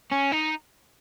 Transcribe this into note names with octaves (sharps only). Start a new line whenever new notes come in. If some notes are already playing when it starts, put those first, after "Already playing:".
C#4
D#4